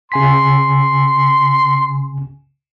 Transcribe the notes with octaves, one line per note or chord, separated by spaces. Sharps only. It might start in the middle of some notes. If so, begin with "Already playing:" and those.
C#3 G#5 C6 B6